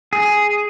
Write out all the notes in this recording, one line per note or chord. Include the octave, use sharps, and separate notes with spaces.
G#4